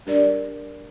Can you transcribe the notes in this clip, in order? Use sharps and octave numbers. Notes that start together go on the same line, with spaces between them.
G3 D4 G4 A#4 D5